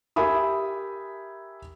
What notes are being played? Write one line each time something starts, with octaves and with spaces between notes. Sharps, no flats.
G4 A#4 E5 G#5 B5 D#6